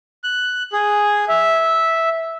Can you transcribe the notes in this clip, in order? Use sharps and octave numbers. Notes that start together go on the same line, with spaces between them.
F#6
G#4
E5